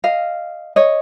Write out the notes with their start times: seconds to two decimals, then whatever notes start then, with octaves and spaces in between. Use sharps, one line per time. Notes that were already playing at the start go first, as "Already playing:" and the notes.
0.04 D#5 F5
0.76 C#5 D#5